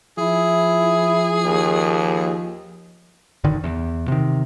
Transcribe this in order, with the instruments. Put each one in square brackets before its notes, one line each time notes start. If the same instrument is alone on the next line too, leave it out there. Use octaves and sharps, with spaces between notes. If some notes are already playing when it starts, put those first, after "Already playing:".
[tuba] F3 [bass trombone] E4 [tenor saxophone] G#4
[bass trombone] D#2
[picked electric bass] F#1 D3 D#3
E2
C3 D#3